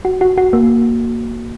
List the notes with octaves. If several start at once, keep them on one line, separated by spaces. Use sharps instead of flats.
F#4
F#4
F#4
A#3